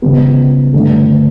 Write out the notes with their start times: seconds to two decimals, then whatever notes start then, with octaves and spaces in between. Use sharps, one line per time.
0.02 C#2 C#3 G3 B3
0.73 G2 D3 A3